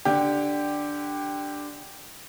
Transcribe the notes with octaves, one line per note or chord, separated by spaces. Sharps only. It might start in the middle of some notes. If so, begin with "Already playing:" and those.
D3 G4